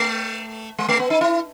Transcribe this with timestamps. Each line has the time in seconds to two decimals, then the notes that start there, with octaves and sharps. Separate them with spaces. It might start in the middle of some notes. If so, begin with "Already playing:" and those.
Already playing: A3
0.78 G#3
0.88 A3
0.99 B3
1.10 D#4
1.21 E4